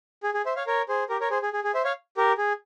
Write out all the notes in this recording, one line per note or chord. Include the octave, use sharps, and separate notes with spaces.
G#4
G#4
C5 E5
C#5 F5
A#4 C#5
G#4 C5
G4 A#4
A#4 C#5
G#4 C5
G#4
G#4
G#4
C5 E5
C#5 F5
G4 A#4
G#4